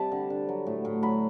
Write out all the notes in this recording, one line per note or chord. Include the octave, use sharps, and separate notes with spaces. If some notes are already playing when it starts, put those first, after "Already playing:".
Already playing: C3 G3 A5 B5
D3
D3
F#3
A2
A2
F#3 B5